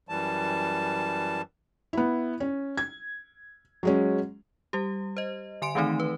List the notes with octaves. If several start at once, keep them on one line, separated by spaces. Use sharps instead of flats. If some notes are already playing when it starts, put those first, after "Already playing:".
F#2 E3 G3 A5
B3 E4
C#4
G#6
F#3 G#3 C#4
G3 G4
C5 D#5
D3 G#5 C6 D7
D#3 E3 A3 C4 D#4
B4